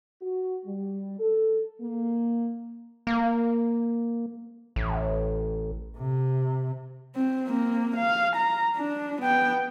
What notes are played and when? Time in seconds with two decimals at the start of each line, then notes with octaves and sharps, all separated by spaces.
0.22 F#4
0.65 G3
1.19 A4
1.81 A#3
3.07 A#3
4.76 A1
5.97 C3
7.16 C4
7.48 A#3 C4
7.96 F5
8.36 A#5
8.77 D4
9.21 B3 G5